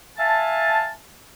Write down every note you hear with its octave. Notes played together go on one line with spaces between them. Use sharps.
E5 F5 G#5 A5